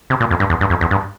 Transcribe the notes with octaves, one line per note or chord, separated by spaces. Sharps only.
C3
A#2
F2
G2
E2
G2
F2
E2
G2